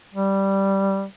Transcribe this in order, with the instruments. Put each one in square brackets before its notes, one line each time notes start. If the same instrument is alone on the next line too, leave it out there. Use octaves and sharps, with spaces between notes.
[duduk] G3